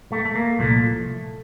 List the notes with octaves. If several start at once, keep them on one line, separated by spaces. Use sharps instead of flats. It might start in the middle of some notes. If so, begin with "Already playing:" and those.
A3
A3
A#3
C2 A#2 F3 A3